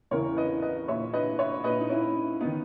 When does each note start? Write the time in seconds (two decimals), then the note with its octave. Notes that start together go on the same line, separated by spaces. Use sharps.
0.11 E2 C#3 E3 A#4 C#5
0.37 B4 D#5
0.62 B4 D#5
0.88 A#2 C#5 E5
1.13 B4 D#5
1.39 C#5 E5
1.64 A#2 B4 D#5
1.80 D#4
1.89 C#4 E4
2.41 D#3 B3 D#4